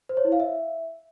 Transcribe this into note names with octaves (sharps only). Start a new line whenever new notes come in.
C5
C#5
E4
F5
E5